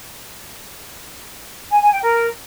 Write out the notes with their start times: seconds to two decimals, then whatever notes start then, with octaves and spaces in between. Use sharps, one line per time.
1.71 G#5
1.81 G#5
1.92 G5
2.02 A#4